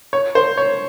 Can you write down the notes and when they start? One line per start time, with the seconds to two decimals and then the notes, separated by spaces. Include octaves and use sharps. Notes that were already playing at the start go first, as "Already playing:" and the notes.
0.13 C#5
0.35 C5
0.57 C#5